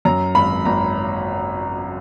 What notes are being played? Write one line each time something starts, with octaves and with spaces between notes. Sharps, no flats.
F#2 A#5
G#1 B5
G#1 A#5